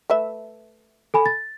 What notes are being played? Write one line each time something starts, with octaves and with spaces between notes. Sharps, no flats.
A3 B4 E5
A4 G#5 B5
A6